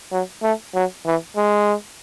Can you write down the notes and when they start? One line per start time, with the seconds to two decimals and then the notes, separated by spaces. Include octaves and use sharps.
0.12 F#3
0.42 A3
0.74 F#3
1.06 E3
1.36 G#3